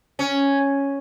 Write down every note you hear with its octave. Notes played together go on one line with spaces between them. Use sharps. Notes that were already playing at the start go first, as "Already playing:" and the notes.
C#4